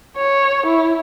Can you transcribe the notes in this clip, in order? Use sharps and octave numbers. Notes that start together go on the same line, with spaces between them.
C#5
E4